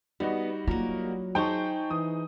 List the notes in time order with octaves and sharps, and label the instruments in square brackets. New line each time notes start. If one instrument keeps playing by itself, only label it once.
[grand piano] G3 D#4 F#4 [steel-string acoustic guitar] B3
[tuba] F#3 [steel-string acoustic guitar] A#3 A#4 [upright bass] F4
[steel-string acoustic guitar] D#4 G#4 C5 [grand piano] G5 A5 C#6
[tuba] E3 [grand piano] D#6